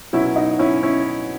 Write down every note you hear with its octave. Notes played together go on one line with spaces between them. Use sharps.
B2 F#3 C#4 E4
D#4 F#4
C#4 E4
C#4 E4